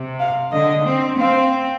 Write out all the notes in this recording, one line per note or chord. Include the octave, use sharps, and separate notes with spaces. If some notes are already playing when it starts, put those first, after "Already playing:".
Already playing: C3
F5
D3 D#5
C4
C4 F5